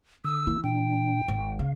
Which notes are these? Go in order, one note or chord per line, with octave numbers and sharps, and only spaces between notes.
D3 D#6 E6
E3 A#3 E4
A#2 D4 G5
G#1
C#3 F5